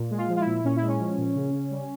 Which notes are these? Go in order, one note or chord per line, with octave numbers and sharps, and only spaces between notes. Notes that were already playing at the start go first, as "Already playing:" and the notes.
Already playing: A#2
G#3
F4
F3
F4
E4
A#2
A#2 C#4
E4
G#3
C#4
F3
A#2
C#3
C#3
G3